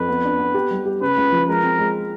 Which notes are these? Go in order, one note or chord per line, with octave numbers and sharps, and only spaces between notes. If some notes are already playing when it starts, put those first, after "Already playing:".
Already playing: F2 B4
B3
D4
B3
G4
G3
G4
C#3 B4
C#2
F3
G#3 A#4
C4
G#3